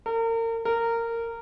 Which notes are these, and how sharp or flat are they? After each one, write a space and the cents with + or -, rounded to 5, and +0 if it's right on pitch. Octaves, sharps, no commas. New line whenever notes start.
A#4 -35
A#4 -15